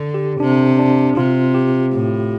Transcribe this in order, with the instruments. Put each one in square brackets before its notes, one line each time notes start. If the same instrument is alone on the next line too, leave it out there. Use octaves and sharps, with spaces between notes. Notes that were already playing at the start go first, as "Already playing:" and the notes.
Already playing: [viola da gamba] D3 [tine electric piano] A4
[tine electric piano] G4
[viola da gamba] C3 [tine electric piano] D4
[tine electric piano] D4
[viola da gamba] C3 [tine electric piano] F4
[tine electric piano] G4
[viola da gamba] A2